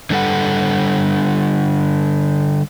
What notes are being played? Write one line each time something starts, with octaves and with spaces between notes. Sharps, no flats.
D3 G3 A4 F#5